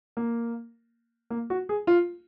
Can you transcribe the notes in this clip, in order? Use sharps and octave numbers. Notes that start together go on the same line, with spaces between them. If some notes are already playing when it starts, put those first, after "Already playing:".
A#3
A#3
F#4
G#4
F4